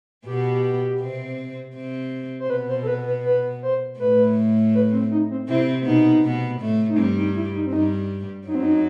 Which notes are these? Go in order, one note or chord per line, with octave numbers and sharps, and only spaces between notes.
B2 B3 G4
C3 C4
C3 C4
C5
B2 B3 B4
C5
A4
B4
B4
B4
C5
A2 A3 B4
B4
C4
D#4
C4
C3 C4 E4
B2 B3 D#4
B2 B3
A2 A3
D#4
G2 G3 C4
D#4
E4
D#4
C4
G2 G3 D#4
F#2 F#3 D#4
C4
D#4